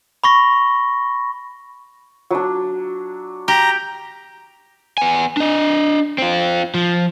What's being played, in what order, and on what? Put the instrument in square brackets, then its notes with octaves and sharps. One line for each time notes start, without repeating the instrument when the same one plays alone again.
[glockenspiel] B5 C#6 A#6
[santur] F#3 D4
[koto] G4 [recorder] A#5
[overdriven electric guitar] B3 G#5
D4 D#5
C4 F4
F3